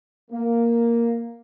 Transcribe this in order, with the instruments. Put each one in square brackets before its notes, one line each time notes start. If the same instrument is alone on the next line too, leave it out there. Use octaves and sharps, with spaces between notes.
[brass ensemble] A#3